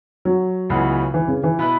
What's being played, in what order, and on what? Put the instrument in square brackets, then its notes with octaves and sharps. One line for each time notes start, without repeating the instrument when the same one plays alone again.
[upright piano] F#3
[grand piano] C#2 C#3 E3 B3 F#4
[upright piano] E3
C#3
E3
[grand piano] B2 B3 E4 B4